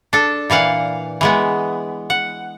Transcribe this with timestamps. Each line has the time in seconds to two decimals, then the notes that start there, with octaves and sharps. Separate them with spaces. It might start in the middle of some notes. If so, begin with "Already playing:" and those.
0.13 D4 A4
0.50 A#2 E3 F5 F#5
1.21 E3 G#3 B3
2.10 F#5